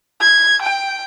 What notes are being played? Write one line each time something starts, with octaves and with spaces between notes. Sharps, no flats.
G#6
G5